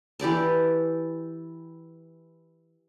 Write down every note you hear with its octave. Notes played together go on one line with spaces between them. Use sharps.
E3 G4 D5 A5